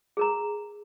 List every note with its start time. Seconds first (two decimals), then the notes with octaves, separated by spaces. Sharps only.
0.17 G#4 A#4 A#5